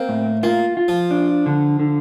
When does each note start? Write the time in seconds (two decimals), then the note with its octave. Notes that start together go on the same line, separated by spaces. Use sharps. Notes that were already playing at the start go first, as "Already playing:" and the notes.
Already playing: A#3 C4
0.09 A2
0.43 A#3 F4
0.77 F4
0.88 F3
1.11 D4
1.46 D3
1.80 D3